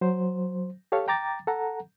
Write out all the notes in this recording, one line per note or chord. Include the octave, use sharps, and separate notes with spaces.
F#3 C5
G4 A4 C#5 F5
G5 A#5 D6 A6
A4 F#5 A#5